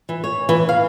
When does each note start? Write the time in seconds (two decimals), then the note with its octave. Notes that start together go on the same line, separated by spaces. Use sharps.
0.09 E3
0.24 C#5
0.49 E3
0.69 F5